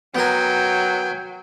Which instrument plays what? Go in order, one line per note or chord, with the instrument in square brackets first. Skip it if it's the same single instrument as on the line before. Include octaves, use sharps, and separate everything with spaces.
[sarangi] F#3 [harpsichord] B3 A#4 [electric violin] G5 G#5